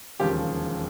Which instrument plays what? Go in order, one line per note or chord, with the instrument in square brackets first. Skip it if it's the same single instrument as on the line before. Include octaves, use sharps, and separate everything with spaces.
[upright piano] E1 D#2 C#3 F3 G4